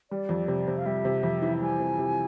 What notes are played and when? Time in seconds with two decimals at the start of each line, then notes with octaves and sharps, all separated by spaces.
0.11 G3 D5
0.29 F2
0.48 C3
0.68 C3
0.77 F5
0.86 G3 E5
1.05 C3
1.23 F2
1.42 E3
1.61 G3 G#5
1.80 C3
1.98 C3